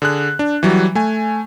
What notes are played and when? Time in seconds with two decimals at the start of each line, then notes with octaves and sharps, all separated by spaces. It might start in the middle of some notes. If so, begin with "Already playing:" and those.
0.02 D3 G#4 F#6
0.39 D4
0.63 E3 F#3 G3
0.95 A3 G#5